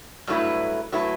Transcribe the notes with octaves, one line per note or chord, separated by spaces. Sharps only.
G2 F#3 A3 E4 B4
F#3 A3 E4 B4